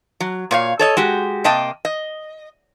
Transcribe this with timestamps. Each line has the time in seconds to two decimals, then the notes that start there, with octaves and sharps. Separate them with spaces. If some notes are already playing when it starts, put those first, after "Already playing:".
0.20 F#3
0.51 A#2 C#5 F5
0.79 A4 C#5 D#5
0.97 G#3 F#4 G4
1.44 C3 A#3 D#5 G5 A5
1.85 D#5